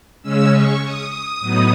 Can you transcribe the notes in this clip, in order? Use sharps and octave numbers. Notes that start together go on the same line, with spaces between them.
C#3 G#3 C#4 E6
C#6
D#6
D#6
A2 F#3 B3 D#4